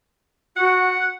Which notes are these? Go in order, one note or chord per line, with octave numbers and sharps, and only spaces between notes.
F#4 F#5